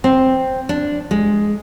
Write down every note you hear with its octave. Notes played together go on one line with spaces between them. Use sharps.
C4
D4
G#3